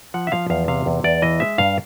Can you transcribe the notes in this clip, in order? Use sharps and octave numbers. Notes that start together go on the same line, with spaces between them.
F3 F#5
E5
F3 F5
E2 F5
C3 F5
E2
E2 D5
E3 D#5
G#3 E5
G2 F5